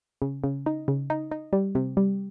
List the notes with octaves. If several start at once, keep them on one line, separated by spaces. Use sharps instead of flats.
C#3
C#3
D#4
C#3
D#4
D#4
G3
C3
G3